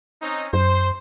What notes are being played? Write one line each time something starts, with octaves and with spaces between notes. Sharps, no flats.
C4 C#4 D#4
F#2 C5